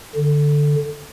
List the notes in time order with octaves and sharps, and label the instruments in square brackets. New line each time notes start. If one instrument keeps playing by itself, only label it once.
[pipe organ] D3